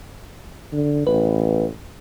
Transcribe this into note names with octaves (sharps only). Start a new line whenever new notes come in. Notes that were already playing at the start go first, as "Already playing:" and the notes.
D3
A1 B4